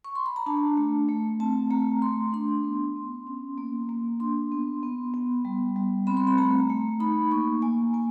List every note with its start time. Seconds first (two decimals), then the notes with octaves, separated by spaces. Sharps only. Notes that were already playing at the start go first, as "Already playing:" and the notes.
0.05 C#6
0.15 C6
0.26 B5
0.36 A#5
0.46 D4 A5
0.77 A3
1.09 A3
1.40 C4 A5
1.71 A3 A#5
2.02 A3 C6
2.33 D4 C6
2.65 B3
2.96 B3
3.27 C#4
3.58 A#3
3.89 A#3
4.20 D4 C6
4.51 B3
4.83 B3
5.14 B3
5.45 G3
5.76 G3
6.07 C4 B5
6.17 C6
6.27 B5
6.38 A3 A#5
6.70 A3
7.00 D#4 B5
7.31 A#3 C#6
7.62 A#3 G#5
7.94 A#3 G#5